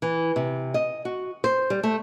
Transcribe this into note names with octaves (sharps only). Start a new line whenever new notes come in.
E3
C3
D#5
F#4
C5
G3
A3